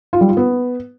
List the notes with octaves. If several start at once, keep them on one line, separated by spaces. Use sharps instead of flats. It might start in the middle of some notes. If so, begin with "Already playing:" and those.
F4
G3
F4
B3